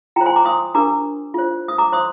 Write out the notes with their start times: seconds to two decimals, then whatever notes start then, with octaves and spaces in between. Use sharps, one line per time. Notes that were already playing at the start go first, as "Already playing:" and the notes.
0.16 F4 G5 A#5
0.21 C5
0.26 G#5 C6
0.36 A#5 D6
0.45 C6 D#6
0.75 D4 G4 A#4 A#5 D6
1.34 F4 C5
1.68 D#6
1.78 A#5 D6
1.92 C5 C6 D#6